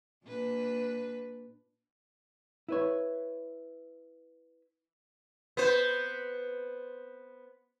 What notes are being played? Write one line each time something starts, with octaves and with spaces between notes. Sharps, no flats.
A#2 D4 B4
E4 B4 C#5
B3 C5